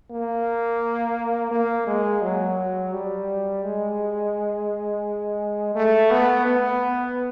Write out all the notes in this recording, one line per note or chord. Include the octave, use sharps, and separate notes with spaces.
A#3
A#3
G#3
F#3
G3
G#3
A3
B3
B3